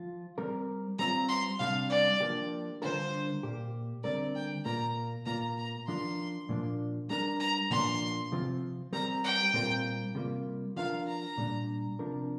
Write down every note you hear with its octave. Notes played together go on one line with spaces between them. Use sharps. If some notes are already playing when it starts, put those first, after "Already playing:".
Already playing: F3 F4
G3 C4 A#4
G3 C4 F4 A#5
C6
C3 G3 D4 G4 F5
D5
F3 A#3 D4 G4
D3 G3 D4 F4 A#4 C5
A#2 A#3 G4
D3 G3 C4 A#4 D5
G5
A#2 A#3 F4 A#4 A#5
A#2 A#3 F4 A#5
A#5
F3 D4 F4 A#4 C6
A#2 F3 A#3 D4
G3 D4 A#4 A#5
A#5
A#2 F3 A#3 D4 C6
C3 F3 C4 F4
G3 C4 G4 A#4 A#5
G5
A#2 G3 C4 F4 A#4
C3 G3 A#3 F4
F3 D4 F4 A#4 F5
A#5
A#2 G3 D4
C3 F3 D4 A#4